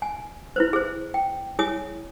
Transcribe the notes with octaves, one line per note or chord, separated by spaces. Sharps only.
G#5
E4 B4 C5
G#4 C5
G5
E4 G#4 C#5 G#5 D#6